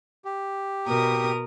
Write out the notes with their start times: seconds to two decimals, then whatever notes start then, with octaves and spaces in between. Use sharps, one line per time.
0.25 G4
0.88 B2 A#4 D#6